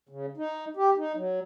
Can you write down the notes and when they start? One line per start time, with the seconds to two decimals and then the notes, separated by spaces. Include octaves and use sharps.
0.09 C#3
0.37 D#4
0.77 G4
0.97 D#4
1.16 F#3